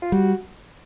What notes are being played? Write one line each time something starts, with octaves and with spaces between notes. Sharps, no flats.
F4
G3 F#4